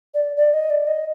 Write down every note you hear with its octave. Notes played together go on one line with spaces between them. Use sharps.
D5
D5
D#5
D5
D#5